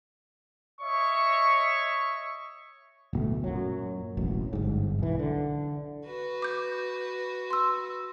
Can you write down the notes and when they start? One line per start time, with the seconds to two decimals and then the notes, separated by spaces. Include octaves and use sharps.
0.81 C#5 D#5 E5 C#6
3.13 D1 B2 A3
3.44 F#2 A#2 F#3
4.17 E1 A1 F#3
4.53 G1 G#2
4.98 B1 E3
5.19 D3
6.05 F#4 B4
6.42 D6 G6
7.51 C6 E6